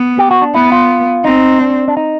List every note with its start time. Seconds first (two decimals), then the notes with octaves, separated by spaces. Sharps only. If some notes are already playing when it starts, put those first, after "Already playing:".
Already playing: B3
0.18 G4
0.31 F#4
0.42 D4
0.54 B3 E4
0.72 F4
1.25 C4 D#4
1.61 D4
1.88 D4
1.97 D#4